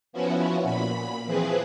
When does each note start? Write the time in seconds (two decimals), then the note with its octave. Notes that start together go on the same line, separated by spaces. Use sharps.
0.13 F3 B3 C#4 E4 F#4
0.63 A#2 B5
1.25 E3 F3 C4 G#4 B4